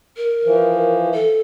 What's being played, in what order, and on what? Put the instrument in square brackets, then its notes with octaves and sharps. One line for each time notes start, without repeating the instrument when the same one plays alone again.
[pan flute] A#4
[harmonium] E3 F3
[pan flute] A4